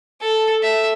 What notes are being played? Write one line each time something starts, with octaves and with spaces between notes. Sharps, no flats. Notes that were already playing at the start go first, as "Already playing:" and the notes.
A4
E5